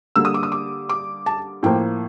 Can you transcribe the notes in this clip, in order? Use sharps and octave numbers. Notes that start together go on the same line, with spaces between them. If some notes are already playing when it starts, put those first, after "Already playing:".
D3 G3 A#3 E6
D#6
D6
D#6
D6
D6
A5
A2 F3 A#3 G5